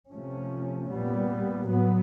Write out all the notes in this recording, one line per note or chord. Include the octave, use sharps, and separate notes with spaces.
C3 F3 A3 C#4
A#2 G3 B3
A2 F#3 B3